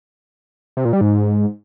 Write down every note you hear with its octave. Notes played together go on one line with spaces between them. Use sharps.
C3
A#2
G3
G#2